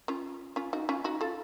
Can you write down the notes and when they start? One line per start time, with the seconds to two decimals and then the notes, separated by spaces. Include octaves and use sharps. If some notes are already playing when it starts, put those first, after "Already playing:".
0.08 C#4 F4
0.56 C#4 F4
0.73 D#4 F#4
0.89 C#4 F4
1.04 D#4 F#4
1.21 F4 A4